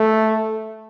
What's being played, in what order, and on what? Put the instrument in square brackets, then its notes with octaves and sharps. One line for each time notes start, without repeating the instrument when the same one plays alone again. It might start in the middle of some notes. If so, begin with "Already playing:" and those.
Already playing: [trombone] A3